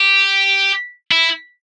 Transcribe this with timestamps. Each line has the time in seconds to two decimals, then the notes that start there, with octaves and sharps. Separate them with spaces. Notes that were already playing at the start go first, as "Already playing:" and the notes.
Already playing: G4
1.11 E4